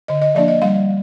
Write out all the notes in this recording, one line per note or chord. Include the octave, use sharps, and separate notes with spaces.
D3 D#5
D#5
F3 A#3 D4 D5
D#5
G3 F5